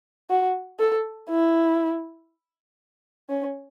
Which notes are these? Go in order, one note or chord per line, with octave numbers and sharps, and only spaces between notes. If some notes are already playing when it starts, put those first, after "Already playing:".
F#4
A4
E4
C#4